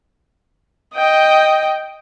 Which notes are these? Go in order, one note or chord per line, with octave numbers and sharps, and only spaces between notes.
D#5 G5